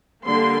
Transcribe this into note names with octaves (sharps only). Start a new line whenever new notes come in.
D3 G3 A#3 C6